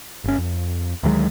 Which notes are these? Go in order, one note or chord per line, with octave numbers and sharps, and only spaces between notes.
G1 C#4
F2
D2 D#3 F#3 G#3